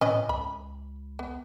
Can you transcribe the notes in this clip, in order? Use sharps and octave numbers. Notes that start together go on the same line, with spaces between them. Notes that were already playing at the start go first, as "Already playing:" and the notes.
A2 C#4 B4 D#5
C#2 B5
B3